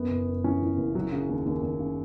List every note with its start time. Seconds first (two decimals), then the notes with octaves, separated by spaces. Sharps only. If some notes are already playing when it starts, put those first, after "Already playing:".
Already playing: F#2 B3
0.10 F#1
0.27 F#2
0.44 E3 C#4
0.62 E3
0.78 F#1
0.95 F#3
1.12 C#3
1.29 D#2
1.46 D#2
1.63 D#2
1.80 C#3